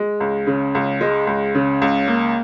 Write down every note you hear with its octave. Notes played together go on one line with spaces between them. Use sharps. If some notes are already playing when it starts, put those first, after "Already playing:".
Already playing: G#3
C#2
C#3
C#2
G#3
C#2
C#3
C#2
A#3